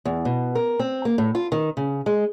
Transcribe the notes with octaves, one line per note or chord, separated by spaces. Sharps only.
E2
B2
A#4
C4
A#3
A2
F4
D#3
C#3
G#3